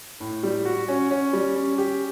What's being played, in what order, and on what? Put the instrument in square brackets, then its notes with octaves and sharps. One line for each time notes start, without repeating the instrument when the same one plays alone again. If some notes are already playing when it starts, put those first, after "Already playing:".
[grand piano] A2
G3
F#4
C#4
C#4
G3
C#4
G4